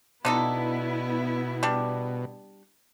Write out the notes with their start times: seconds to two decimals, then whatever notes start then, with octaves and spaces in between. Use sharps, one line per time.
0.25 B2 D3 B3 D#4 E4 A4
1.63 G3 D4